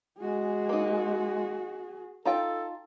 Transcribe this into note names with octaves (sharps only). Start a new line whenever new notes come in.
G#3 F#4 G#4
A#3 D#4
D#4 F4 A4 G5